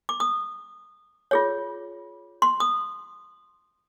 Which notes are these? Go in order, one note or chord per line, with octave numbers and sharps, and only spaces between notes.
D6
D#6
F4 G#4 C#5
C6
D#6